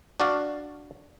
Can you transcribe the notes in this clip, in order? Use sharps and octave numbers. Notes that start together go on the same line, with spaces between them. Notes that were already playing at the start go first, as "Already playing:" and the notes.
D4 F#4 D5 F5